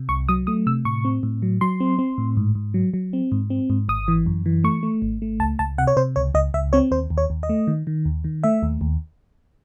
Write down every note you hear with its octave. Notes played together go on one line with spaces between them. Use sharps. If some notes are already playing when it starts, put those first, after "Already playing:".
Already playing: C3
C2 C#6
F#3 D#6
A3 D#6
C3 E6
A2 C#6
C4
A2
F#3
F#3 C6
C4
C4
A2
G#2
G#2
F#3
F#3
C4
G#2
C4
G#2
G#1 D#6
E3
F#2
E3
A3 C#6
A3
G#1
A3
C#2 A5
C#2 A5
C3 F#5
C#5
C3 C5
C#2 C#5
C#2 D#5
C#2 E5
C4 C#5
D#2 C5
D#2
C#5
D#2
D#5
A3
D#3
D#3
D#2
D#3
A3 E5
D#2
D#2